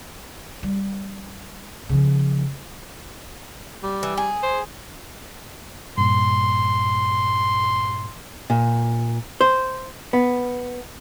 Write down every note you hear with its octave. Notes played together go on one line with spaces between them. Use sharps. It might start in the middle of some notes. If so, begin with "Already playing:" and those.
G3
C#3 F3
G3
E3
G#4
C5
G2 A#2 C6
A#2
C5
B3